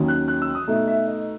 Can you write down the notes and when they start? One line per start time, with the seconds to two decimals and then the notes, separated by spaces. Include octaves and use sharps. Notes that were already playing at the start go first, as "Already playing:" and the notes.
Already playing: D#2 D#3 F#3 C#4
0.08 F#6
0.28 F#6
0.42 E6
0.55 D#6
0.67 B2 A3 D#4 E5
0.88 E5
1.08 D#5